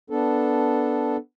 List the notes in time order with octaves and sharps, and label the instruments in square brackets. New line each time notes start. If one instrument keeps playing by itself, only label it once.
[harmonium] B3 D4 A4